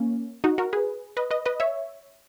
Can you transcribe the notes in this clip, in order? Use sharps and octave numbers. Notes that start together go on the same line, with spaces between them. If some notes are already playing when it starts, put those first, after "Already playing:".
Already playing: A#3 C#4
D#4 F#4
F#4 A#4
G#4 B4
B4 D#5
B4 D#5
B4 D#5
C#5 E5